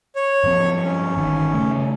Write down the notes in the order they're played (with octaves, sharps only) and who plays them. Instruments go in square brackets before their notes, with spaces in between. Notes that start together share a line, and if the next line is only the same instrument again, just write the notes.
[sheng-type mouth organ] C#5
[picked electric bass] G2 F3 C4
[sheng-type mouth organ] C#4
[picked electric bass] G1 D#3
C#3 A3